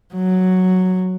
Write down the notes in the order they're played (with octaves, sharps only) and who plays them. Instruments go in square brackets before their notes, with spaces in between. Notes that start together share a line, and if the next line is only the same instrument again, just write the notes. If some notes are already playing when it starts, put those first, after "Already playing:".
[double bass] F#3